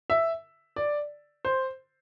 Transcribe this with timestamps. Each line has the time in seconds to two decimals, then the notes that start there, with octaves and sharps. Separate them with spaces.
0.10 E5
0.76 D5
1.45 C5